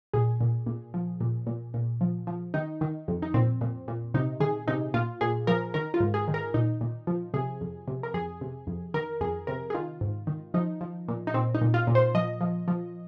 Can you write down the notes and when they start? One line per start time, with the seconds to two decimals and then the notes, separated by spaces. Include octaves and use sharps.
0.13 A#2 G#4
0.41 A#2
0.66 A#2
0.94 F3
1.21 A#2
1.47 A#2
1.74 A#2
2.01 F3
2.27 F3
2.54 D#3 D#4
2.81 D#3
3.08 F2
3.22 D#4
3.34 A#2 C4
3.61 A#2
3.88 A#2
4.14 C3 D#4
4.40 D#3 G#4
4.68 C3 D#4
4.94 A#2 F4
5.21 A#2 G#4
5.47 F3 A#4
5.74 D#3 A#4
5.94 F4
6.00 G#2
6.14 G#4
6.28 D#3
6.34 A#4
6.54 A#2 D#4
6.81 A#2
7.07 F3
7.34 C3 G#4
7.61 F2
7.88 C3
8.03 A#4
8.14 F2 G#4
8.41 C3
8.67 F2
8.94 D#3 A#4
9.21 F2 G#4
9.47 C3 A#4
9.70 G#4
9.75 D#3 F4
10.01 G#2
10.27 D#3
10.54 F3 D#4
10.81 F3
11.08 A#2
11.27 D#4
11.34 A#2 C4
11.55 D#4
11.61 A#2
11.74 F4
11.87 A#2
11.95 C5
12.15 F3 D#5
12.41 F3
12.68 F3